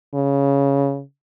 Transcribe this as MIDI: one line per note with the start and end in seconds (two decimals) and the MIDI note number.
0.14 1.02 49